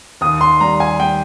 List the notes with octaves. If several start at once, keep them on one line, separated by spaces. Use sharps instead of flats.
D#2 D#6
C6
G3 A#5
G#5
G3 G5